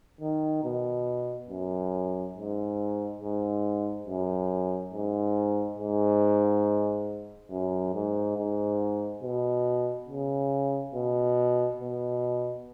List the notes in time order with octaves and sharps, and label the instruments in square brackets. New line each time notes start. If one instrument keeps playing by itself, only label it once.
[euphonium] D#3
B2
F#2
G#2
G#2
F#2
G#2
G#2
F#2
G#2
G#2
B2
C#3
B2
B2